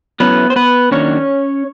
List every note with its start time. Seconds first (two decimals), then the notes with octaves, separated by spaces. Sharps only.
0.20 F#3 A3 B3 C#4 E4 B4
0.50 C5
0.56 B3 B4
0.91 D#3 F#3 A#3 C#4 D4 C#5